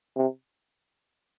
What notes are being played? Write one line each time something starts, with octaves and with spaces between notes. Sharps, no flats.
C3